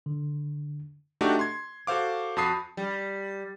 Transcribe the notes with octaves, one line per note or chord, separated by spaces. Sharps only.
D3
A3 D4 D#4 F#4 G4
C6 G#6
F#4 A4 C5 F5 D6
F2 F#4 A5 B5 D#6 C7
G3